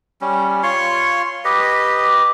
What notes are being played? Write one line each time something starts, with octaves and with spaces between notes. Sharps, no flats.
G3 C#4
F4 C#5 C6 C#6
G4 B4 D#5